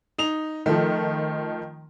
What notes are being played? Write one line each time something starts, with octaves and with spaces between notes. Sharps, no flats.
D#4 F7
D#3 F3 A3